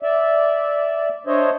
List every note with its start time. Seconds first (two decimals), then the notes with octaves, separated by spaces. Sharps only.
0.02 D5 E5
1.27 D4 C5 C#5 D#5 E5